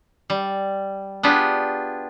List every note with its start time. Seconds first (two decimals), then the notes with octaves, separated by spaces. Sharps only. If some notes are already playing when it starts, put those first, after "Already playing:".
0.30 G3
1.23 B3 D4 F4 G4 G#4